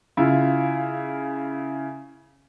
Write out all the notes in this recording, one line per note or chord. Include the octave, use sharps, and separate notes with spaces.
C#3 E4 F4